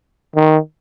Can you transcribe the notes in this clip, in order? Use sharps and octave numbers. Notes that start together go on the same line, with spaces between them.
D#3